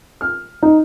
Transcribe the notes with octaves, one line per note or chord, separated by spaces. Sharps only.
F6
D#4